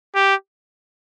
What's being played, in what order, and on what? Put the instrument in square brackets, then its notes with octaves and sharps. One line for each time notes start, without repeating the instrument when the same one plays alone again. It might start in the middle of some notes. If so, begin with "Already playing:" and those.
[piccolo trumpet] G4